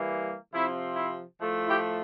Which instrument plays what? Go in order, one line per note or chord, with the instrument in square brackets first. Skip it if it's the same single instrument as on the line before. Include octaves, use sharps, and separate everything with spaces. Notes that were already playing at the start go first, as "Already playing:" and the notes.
Already playing: [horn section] E3 G3 A#3
C3 F3 C4 E4
E4
A2 F3 A3
E4 G4